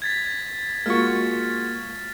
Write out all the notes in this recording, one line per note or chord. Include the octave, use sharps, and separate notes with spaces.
G#6 A6 B6
G#3 A#3 F4 F#4 C#6 F6 A6